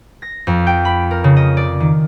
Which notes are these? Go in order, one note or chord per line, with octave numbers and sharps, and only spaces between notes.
A#6
F2
G5
B5
A#4
C#3
D#5
D5
D#3